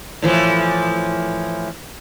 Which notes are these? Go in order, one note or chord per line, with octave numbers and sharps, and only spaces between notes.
A2 E3 F3